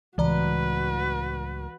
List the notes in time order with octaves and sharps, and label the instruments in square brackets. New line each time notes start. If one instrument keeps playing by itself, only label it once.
[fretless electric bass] C#2 A2 [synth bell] E3 D5 A#5 [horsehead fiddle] F#4 B4